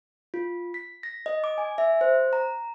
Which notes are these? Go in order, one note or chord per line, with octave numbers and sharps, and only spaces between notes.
F4
B6
A#6
D#5
D6
G#5
E5
C5
A#5